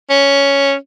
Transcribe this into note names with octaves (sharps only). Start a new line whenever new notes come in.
C#4